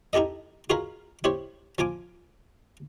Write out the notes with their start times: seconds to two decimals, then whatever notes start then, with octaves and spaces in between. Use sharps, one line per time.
0.13 D#4 E4 G4 A4 D#5
0.70 F4 F#4 G#4 A#4 B4 F5
1.24 E4 G4 C5 C#5
1.78 F3 F4 G#5 D6